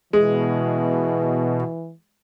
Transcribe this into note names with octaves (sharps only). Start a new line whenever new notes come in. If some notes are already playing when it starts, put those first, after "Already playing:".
B2 E3 G#3